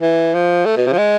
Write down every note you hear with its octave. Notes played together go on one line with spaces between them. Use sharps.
E3
F3
A3
B2
C3
F3
G#3